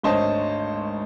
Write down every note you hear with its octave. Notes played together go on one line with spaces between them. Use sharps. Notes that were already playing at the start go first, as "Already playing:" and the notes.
G#1 D2 C5 C#5 D#5 A5